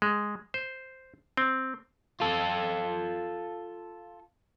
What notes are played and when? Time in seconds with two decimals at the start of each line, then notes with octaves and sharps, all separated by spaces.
0.02 G#3
0.54 C5
1.37 C4
2.20 F4 A4